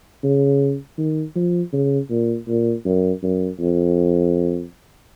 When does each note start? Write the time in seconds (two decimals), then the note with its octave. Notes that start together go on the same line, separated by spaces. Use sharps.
0.24 C#3
0.98 D#3
1.36 F3
1.73 C#3
2.10 A#2
2.48 A#2
2.86 F#2
3.23 F#2
3.60 F2